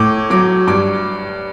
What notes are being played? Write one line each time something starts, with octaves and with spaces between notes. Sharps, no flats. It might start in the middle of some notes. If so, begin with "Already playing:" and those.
Already playing: A2 D6
F#3 D6
G2 D6